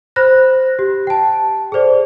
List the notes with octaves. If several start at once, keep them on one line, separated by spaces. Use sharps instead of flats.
C5 B5 F#6 A#6
G4
G5 A5
G#4 A4 C5 D5